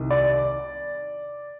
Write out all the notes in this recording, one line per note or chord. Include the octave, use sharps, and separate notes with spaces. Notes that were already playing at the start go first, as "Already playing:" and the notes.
Already playing: C2 C3 D#3
D5